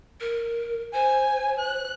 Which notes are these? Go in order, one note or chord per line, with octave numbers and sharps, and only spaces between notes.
A#4
C5 G#5
F#6